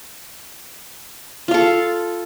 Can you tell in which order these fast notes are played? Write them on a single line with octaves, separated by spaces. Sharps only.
F4 F5 A4